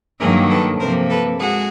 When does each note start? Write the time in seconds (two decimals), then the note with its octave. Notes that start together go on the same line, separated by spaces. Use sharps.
0.20 G2 D#3 F#3 A#3 G#4 A#4
0.49 A4 B4
0.79 C3 F3 A#3 A#4 C5
1.09 A4 B4
1.38 G#3 F#4 G#4